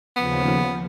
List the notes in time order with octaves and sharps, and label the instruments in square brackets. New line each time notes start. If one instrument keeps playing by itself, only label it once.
[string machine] D#2 C#3 F3 [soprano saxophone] B3